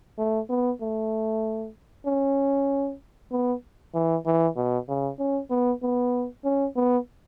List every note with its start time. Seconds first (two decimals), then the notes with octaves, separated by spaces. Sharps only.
0.18 A3
0.49 B3
0.81 A3
2.06 C#4
3.31 B3
3.94 E3
4.26 E3
4.56 B2
4.88 C#3
5.19 C#4
5.50 B3
5.82 B3
6.45 C#4
6.76 B3